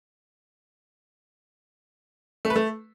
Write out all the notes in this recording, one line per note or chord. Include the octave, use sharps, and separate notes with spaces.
A3
B4
A3